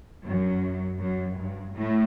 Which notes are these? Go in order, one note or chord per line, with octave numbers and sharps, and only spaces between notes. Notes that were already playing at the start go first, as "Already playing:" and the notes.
F#2
F#2
G2
A2